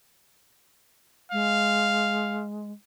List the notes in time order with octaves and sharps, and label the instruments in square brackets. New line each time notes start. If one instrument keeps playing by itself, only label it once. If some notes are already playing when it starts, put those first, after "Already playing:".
[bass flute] G#3 [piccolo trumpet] F5